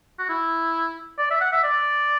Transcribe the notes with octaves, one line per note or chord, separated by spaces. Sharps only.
F#4
E4
D5
E5
F#5
E5
D5